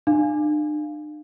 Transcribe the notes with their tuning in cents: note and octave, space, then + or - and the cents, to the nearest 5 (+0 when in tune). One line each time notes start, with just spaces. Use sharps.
D4 +40 F5 +0